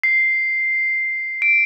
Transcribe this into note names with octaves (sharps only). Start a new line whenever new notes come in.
C7
D7